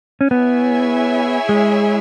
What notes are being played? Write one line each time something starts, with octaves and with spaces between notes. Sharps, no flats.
C#4
B3 E4 G#4 C#5 E5 G#5
G#3